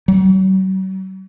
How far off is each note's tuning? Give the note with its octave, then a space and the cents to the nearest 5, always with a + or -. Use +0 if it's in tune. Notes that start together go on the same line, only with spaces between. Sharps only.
F#3 +45